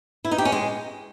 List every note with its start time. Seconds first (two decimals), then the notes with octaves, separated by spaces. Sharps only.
0.25 E4
0.31 D#4
0.38 G4
0.45 C#4
0.52 G#3